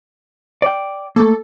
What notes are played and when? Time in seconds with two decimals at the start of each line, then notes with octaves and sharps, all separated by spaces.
0.62 D5 G5
1.16 A3 A#3 A4